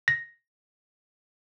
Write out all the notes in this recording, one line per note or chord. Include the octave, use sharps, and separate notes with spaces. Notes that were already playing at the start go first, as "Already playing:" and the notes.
A#6